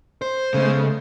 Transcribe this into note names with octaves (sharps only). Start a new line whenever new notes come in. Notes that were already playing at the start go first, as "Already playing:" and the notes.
C5
C#3 G#3 A3 B3